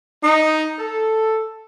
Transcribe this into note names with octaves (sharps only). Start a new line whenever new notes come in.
D#4
A4